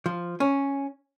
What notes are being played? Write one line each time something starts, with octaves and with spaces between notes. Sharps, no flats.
F3
C#4